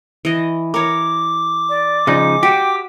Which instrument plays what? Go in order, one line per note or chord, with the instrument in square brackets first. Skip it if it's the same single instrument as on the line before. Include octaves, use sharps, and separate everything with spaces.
[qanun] E3 D#5
[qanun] A#4 C#5 [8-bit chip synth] D6
[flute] D5
[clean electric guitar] C#3 F3 D#4 [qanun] G#3
[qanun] F#4 [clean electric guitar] G4 [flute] G5